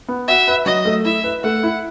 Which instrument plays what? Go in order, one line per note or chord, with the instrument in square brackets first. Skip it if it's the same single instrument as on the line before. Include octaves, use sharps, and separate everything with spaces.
[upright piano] B3
[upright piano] F#4 [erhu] E5
[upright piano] B4
[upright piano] F#3 [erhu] D#5
[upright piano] A3
[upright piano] E4 [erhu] E5
[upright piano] B4
[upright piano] A3 [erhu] F#5
[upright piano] E4